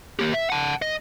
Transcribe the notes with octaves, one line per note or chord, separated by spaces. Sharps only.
A#3 G4
E5
F#5 A5
D#5